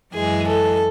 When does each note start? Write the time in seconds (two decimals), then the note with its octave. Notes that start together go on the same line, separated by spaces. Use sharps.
0.13 F#2 E3 G#3 G#4
0.48 A4